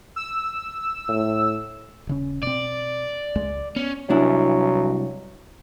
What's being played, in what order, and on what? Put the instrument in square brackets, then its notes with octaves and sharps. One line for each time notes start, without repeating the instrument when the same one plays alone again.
[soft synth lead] E6
[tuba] A2
[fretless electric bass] D#1 C#3 C#4
[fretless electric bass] B2 C4 [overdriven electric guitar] D5
[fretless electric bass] C#2 G#3
[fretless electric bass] B3 [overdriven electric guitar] C#4
[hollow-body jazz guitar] C2 D4 E4 [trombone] F#3